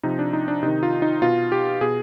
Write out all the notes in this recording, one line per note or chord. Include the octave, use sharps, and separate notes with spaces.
C3 F3 D#4
D4
D#4
D4
C3 D#3 D#4
F4
D#4
B2 F4
G4
B2 G#4